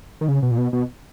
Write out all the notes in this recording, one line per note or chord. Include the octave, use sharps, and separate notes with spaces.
D#3
C#3
B2
A#2
B2
B2